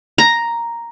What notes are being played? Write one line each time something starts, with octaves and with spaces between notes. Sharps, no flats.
A#5